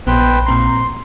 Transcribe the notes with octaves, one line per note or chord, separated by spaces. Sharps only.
A#1 B3 B4 C5 G5
A#2 C4 A#5 C6